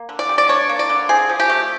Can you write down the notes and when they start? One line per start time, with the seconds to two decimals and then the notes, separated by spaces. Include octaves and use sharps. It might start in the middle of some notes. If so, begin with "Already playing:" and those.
Already playing: A#3
0.09 D3
0.19 D5
0.29 G3
0.38 D5
0.49 D4 C#5
0.69 A#3
0.79 D5
0.90 D3
1.09 C4 G#4
1.29 F3
1.40 G4
1.49 A3